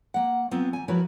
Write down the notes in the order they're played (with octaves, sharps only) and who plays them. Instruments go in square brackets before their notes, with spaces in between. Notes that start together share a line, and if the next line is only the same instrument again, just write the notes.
[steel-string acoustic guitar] A#3 F#5
F#3 B3 C4 F4
D#2 G#5
F3 E4 F#4 A#4 B4 C#5